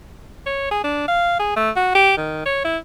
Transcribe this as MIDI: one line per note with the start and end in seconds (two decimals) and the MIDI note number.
0.46 0.66 73
0.71 0.80 68
0.84 1.03 62
1.08 1.35 77
1.39 1.52 68
1.56 1.70 57
1.76 1.94 66
1.95 2.14 67
2.17 2.45 51
2.45 2.61 73
2.64 2.78 64